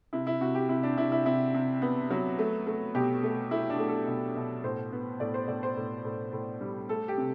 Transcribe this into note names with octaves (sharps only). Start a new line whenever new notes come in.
C3 E4
E4
C3 F#4
G4
C3 E4
D4
C3 E4
E4
C3 E4
C3
B3
F#3
A3
A3
B2 G4
A3
A3 E4
D4
A3
A4
B2
B2
A2 C5
B3
A2 D5
C5
A2 D5
C5
A2
A2
A2
G3
A3 A4
G4
C3